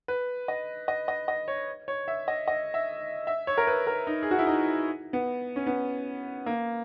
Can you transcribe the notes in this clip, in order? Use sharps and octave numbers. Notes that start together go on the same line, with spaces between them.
B4
D#5
D#5
D#5
D#5
C#5
C#5
E5
D#5
D#5
E5
E5
C#5
A#4
B4
A#4
D#4
G#4
F#4
E4
D#4
B3
C#4
B3
A#3